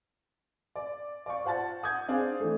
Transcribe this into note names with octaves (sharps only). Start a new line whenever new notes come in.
D5
D5 F5 C#6
F4 C5 F#5 A5 A6
F#5 D#6 G6 G#6
C4 D4 G#4 F5 G#5
E3 A3